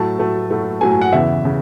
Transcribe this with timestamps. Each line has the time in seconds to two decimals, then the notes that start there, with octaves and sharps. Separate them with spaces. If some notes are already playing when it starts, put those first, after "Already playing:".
Already playing: A2 F#3 A3 A5
0.19 A2 F#3 A3
0.50 A2 F#3 A3
0.81 A2 F#3 A3 G#5
0.91 G#5
1.02 F#5
1.12 E2 C#3 E3 E5
1.45 C#3